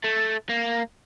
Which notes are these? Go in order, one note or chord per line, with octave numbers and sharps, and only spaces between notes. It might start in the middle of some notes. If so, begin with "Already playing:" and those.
A3
A#3